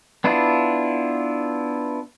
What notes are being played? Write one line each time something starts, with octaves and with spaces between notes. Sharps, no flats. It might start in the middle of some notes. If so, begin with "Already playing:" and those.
B3 D4 E4 F4